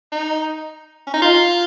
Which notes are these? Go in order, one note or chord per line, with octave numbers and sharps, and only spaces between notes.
D#4
C#4
D#4
F4